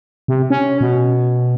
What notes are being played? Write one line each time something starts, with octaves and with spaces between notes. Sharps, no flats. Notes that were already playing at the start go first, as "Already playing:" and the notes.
C3
C#4
B2